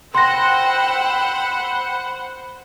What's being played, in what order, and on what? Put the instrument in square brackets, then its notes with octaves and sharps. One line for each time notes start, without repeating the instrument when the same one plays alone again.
[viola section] C5 F#5 [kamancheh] G5 E6 [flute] B5 [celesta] C6 A#6